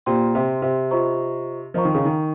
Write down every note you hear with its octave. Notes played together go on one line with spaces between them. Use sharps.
A#2 G4 C5 G5 C6
C3
C3
F4 C5 D#5 A#5 C#6
F3 A#4 D#5 A#5 C#6
D#3
C#3
D#3